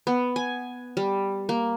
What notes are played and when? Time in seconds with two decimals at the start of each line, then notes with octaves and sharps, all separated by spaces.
0.07 B3
0.36 G#5
0.97 G3
1.49 A#3